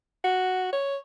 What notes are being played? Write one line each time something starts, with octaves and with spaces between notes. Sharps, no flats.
F#4
C#5